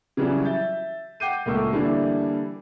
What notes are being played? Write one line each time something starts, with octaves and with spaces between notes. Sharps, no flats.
C#3 E3 F#3 G3
E5 G6 A6
F#5 G5 D6 G6 C7 D#7
C#2 A#2 A3 A#4 C#6 E6
D3 E3 G3 A#3 D4 E4